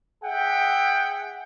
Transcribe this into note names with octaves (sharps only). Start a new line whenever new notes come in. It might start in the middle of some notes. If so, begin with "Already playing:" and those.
G#4 E5 F#5 G5